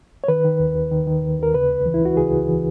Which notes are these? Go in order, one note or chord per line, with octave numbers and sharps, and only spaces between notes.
C#5
D#3 B4
D#3
D#2
D#2
D#3
D#3
D#2
D#2 A#4
C#3 B4
C#2
E3
E4
C#2 F#4
C#3 G#4
C#2
E3